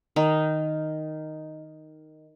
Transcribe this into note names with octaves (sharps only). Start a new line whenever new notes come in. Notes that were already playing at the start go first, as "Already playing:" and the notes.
D#3 D#4